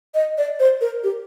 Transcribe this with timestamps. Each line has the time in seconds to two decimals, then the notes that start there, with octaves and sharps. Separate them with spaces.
0.15 D#5
0.38 D5
0.60 C5
0.81 A#4
1.04 G4